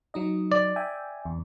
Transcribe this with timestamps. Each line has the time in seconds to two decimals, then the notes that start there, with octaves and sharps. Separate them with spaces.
0.14 F#3 D#4 D#5
0.52 D5
0.76 E5 G5 G#5
1.25 E2